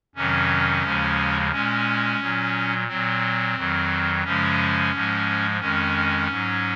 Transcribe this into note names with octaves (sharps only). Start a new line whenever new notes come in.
F2 C3 D#3 F#3 C#4
D#2 C#3 F3 G#3
A#2 G#3 C#4
A#2 F#3
A#2 F#3 C4
F2 D#3 F#3
F#2 C#3 F3 G#3 C#4
G#2 F3 G#3
F2 D#3 G#3 C#4
G#2 F#3